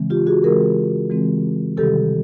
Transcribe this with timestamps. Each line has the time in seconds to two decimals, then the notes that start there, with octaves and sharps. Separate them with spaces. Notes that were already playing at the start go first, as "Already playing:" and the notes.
Already playing: C#3 E3 G#3 C4
0.10 F4 G4
0.27 F#4 G#4
0.43 C#3 E3 G#3 C4 G#4 A#4
1.10 C#3 E3 G#3 C4
1.77 C3 D#3 G3 G4 A4